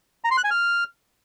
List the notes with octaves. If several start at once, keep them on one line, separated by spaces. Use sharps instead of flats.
A#5
C6
F#6
G#5
F6